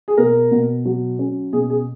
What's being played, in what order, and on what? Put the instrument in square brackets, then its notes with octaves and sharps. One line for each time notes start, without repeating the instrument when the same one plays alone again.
[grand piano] G#4
B2 A#4
B2
F#3
C#4
B2 G#4
G#4